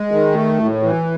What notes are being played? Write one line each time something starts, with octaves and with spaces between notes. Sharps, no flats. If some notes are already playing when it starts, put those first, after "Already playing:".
Already playing: G#3
D#3
A3
A2
E3